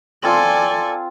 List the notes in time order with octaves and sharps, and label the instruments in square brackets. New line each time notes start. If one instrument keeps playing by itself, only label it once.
[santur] C4 F4 [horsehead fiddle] A4 G#5 [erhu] D5